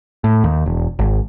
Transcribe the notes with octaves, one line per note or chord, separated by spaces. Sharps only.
A2
D#2
E1
G#1